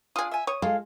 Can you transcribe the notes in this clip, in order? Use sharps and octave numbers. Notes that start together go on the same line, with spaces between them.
D4 F4 G#4 D#6
E5 G#5
C#5 D#6
G#3 F4 A4 F5